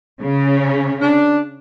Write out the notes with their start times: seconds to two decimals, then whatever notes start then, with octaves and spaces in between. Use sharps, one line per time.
0.21 C#3 C#4
1.01 D4